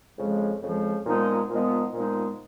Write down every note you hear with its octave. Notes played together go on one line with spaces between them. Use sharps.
F2 C#3 F3 G#3
F2 C#3 F3 G#3
A#2 F3 G#3 B3 D#4
A#2 F3 G#3 B3 D#4
A#2 F3 G#3 B3 D#4